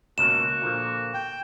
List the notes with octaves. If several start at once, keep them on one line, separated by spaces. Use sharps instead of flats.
C#2 B2 A#3 F#4 E7
A#2 D3 F3
G5